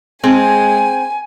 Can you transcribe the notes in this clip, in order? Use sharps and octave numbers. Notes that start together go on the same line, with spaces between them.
G#3 C4 G#5